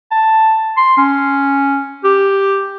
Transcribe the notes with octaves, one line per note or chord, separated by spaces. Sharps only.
A5
C6
C#4
G4